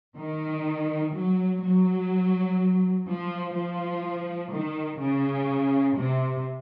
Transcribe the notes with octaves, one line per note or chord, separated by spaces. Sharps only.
D#3
F#3
F#3
F3
F3
D#3
C#3
C3